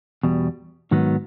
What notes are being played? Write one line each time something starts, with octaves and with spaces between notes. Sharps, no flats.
E2 B2 G3
G#2 D#3 F#3 B3